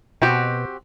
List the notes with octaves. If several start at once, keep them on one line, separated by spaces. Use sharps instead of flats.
B2 C4 F#4 G4